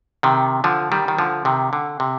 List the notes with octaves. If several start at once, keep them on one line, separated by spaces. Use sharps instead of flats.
C3 D#3
D3 F3
D#3 G3
D#3
D3 F3
C3 D#3
D3
C3